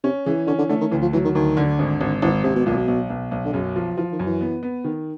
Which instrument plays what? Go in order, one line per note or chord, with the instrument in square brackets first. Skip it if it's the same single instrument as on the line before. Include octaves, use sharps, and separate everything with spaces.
[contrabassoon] C3 [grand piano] C#4
[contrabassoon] C#3 [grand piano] E3
[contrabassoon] D3 [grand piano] C#4
[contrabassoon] D3
[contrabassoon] D3 [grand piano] A3
[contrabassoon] D#3
[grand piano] D2 [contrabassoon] E3
[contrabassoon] F3
[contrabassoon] E3 [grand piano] F#3
[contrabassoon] D#3
[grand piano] D2 [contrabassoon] D#3
[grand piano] D3
G#1
G#1
[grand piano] G#1 [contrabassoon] E3
[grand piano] G#1 [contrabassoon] C3
[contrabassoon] B2
[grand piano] B1 [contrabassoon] A#2
[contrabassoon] B2
[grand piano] B1
B1
B1
[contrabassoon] D3
[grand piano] F#2 [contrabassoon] C#3
[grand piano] F3
[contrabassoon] E3 [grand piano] F3
[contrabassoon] D#3
[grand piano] F#2
[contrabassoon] E3
[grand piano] B3
B3
D#3